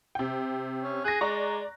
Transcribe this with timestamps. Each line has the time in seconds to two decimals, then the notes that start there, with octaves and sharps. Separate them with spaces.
0.15 C3 G5
0.82 C#4
1.04 G#4 F#6 A#6
1.21 G#3 D5 A#5 C#6